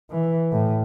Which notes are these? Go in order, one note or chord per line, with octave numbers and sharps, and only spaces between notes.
E3
A2